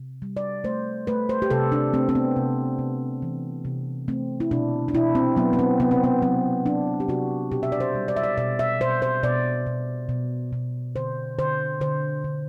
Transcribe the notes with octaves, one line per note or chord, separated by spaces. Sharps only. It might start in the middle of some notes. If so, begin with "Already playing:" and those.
Already playing: C3
G3
D5
A3 C5
A3 B4
C5
G4
C3 A4
D4
A3 C4
C4
B3
C3
C3
E3
C3
A3 C4
E4
B2 D4
D4
B2 E4
C4
F#3 B3
B3
C4
C3 B3
C4
B3
F#3 C4
F#3 D4
G4
C3 F#4
B2 G4
E5
D5
C5
G3
D5
E5
D5
B2 D5
E5
B2 C5
C5
B2 D5
B2
B2
B2
D3 C5
D3 C5
D3 C5
D3